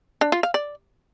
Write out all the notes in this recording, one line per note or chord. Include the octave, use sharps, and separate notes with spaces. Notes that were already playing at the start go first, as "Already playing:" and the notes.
D4
F4
F5
D5